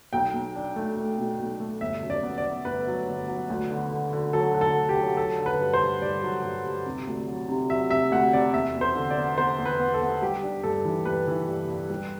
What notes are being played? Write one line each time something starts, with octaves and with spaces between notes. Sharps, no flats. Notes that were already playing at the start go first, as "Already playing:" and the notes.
B1 G5
B1
D4
A3
A3
B2
B1
A3
G1 E5
F#2
D5
B3
D5
B3
G1 B4
F#3
G1
F#3
D2
D3
D3
D3
F#3 A4
D3
A4
D3
G4
F#3
F#3 A4
D3
B4
G2
C5
G2
G2 D5
F#3
G2
G2
C3
D2
F#3
C3
F#3 E5
C3 E5
D2 F#5
C3 D5
E2 E5
E2
C5
D3
D5
B3
B3 C5
E2
B4
B3
A4
B3
G3 G4
D4
G2 A4
E3
G2 B4
E3
G2
G2
G3